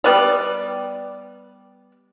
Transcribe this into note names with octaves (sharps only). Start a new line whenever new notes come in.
G3 B3 D5